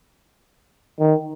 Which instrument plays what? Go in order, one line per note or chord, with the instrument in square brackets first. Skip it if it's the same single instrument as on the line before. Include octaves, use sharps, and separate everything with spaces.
[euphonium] D#3